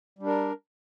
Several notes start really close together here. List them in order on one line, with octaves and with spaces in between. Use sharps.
G3 D4 A#4